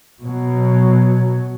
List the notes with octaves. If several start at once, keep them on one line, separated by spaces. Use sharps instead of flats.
B2 F#3